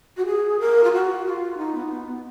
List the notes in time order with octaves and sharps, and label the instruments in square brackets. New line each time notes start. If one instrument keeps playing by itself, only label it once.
[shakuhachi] F#4
G#4
A#4
F4
F#4
F4
D#4
B3
B3
B3